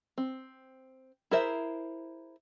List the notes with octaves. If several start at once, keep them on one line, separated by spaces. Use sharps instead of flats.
C4
E4 G#4 A#4 C5 E5